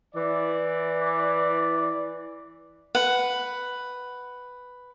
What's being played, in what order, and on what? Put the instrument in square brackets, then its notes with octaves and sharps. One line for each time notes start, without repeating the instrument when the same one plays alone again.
[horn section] E3 D5
[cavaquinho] B4 F#5